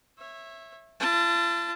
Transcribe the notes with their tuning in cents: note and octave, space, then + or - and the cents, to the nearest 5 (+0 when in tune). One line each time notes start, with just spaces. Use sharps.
C#5 -25 E5 +0
F4 -45 A5 +0